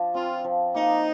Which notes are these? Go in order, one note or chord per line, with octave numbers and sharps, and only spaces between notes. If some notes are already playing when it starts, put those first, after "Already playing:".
Already playing: F3 D4
C4 F4
F3
A#3 D#4